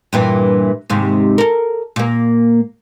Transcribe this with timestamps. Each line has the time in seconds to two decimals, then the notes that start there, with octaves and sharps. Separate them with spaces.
0.13 G2 A#2 E3
0.90 D#2 G#2 C3
1.38 A4 A#4
1.96 A#2 A#3